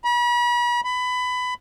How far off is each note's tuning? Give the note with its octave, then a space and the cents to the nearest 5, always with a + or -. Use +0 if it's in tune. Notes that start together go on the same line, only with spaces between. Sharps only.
B5 -40
B5 +20